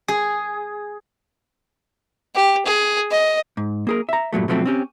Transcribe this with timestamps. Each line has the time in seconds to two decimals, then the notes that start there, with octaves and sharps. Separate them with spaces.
0.08 G#4
2.35 G4
2.66 G#4
3.11 D#5
3.57 G#2
3.87 A#3 G#4 A#4
4.09 E5 A#5
4.33 G2 A#2 F#3 A3
4.48 B2 F3 F#3 A3 C4
4.65 C4 C#4 G4